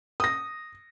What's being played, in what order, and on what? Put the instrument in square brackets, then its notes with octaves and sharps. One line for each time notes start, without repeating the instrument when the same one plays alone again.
[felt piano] D#6 A#6